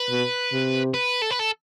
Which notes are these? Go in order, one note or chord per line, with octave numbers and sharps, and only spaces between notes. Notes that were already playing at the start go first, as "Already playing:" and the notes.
Already playing: B4
B2
C3
B4
A4
B4
A4